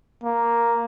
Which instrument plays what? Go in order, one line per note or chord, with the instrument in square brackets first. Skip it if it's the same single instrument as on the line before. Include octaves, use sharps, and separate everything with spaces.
[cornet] A#3